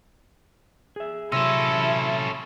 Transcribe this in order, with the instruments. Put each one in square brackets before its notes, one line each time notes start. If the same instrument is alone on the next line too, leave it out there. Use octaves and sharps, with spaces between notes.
[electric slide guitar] G#4 E5
[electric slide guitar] C3 F#3 [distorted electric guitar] C#4 A4 [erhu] E4 [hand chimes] C6 E6 A#6